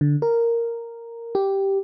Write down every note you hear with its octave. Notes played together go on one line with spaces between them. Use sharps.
D3
A#4
G4